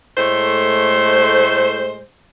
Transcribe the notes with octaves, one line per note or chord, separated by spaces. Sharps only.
A2 G#3 A3 C5